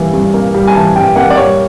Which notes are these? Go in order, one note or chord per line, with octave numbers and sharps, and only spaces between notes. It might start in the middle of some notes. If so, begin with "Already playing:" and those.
Already playing: G2 E3 G3 A#3
G2
A#3
G3
G#5
E3 A5
G2 G5
A#3 F#5
D5
G3 C#5